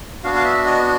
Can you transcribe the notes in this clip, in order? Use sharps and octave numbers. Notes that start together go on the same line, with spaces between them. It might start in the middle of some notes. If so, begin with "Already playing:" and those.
B3 D4 F#4 F5
F5
E5
D#5